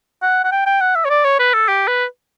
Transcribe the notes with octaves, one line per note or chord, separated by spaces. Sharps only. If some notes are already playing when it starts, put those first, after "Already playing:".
F#5
F#5
G5
G5
F#5
E5
C#5
D5
C#5
B4
A4
G4
B4